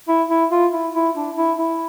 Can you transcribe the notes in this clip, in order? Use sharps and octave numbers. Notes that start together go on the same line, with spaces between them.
E4
E4
F4
E4
E4
D4
E4
E4